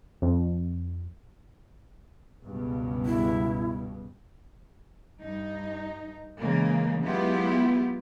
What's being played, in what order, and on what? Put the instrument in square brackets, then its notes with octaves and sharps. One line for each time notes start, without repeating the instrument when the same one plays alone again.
[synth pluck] F2
[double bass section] C#2 G2 B2
[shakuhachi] E4
[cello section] G2 D#4
C#3 E3 G#3 A#3
F#3 G#3 B3 E4 F4 G4